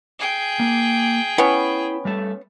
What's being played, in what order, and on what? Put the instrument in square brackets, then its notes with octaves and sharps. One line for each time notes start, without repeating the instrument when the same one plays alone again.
[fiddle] G#4 G5
[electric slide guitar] A#3
[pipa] B3 C#4 [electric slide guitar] E4
[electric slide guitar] G3 A3 A4